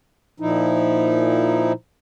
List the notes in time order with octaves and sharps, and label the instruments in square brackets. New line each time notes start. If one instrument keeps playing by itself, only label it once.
[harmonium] A#2 F3 D#4 E4